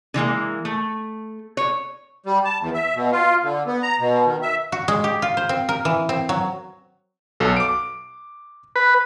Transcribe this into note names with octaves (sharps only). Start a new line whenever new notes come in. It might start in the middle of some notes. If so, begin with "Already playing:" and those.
D3 E3 G#3 A#3
A3
C#5
G3
A5
E2
E5
B2
F4
D3
B3
A#5
B2
D#3
E5
F#4
G#3
G4
F4
C5
C4
A#4
E3
C4
F#3
B1 B2 A4
D6 D7
B4